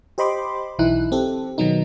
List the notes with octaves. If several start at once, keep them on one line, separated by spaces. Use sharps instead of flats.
G4 C5 D#5 B5 C6 D6
B1 E3 D#4 E4 F#6
C4 G4 A4
B2 D#3 F#3 B3 D#4